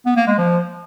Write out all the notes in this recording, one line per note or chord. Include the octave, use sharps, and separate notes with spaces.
B3
A#3
G#3
F3